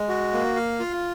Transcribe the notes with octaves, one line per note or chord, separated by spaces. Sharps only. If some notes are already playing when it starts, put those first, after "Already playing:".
Already playing: G#3
F#4
A#3
F5
F4